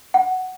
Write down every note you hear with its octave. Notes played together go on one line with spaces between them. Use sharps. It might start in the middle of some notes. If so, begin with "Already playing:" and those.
F#5